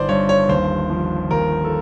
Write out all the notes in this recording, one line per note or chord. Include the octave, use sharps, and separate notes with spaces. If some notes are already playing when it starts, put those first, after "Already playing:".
Already playing: G1 D#3 C5 D5
G2 C#5
C#5
D#2 C5
F3
D#2 A#4
A4